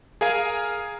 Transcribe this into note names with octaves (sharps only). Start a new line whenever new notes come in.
G#4 A#4 F5 G#5